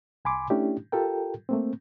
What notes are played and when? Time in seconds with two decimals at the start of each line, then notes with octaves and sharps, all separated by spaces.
0.25 C2 G#5 B5 C6 D6
0.50 A3 C#4 D4 E4 G4
0.92 F4 G4 A4 A#4 G5
1.49 A3 A#3 C4